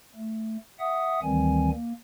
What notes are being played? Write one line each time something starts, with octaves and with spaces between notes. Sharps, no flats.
A3
E5 F#5 D#6
D2 D#3 E3 G3 C4 G#5
A#3